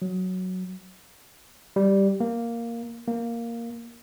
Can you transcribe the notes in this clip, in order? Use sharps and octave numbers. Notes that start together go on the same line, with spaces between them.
F#3
G3
A#3
A#3